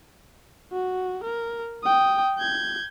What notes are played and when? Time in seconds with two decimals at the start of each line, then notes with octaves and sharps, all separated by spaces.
0.72 F#4
1.24 A#4
1.83 G5 D#6
2.38 G6 G#6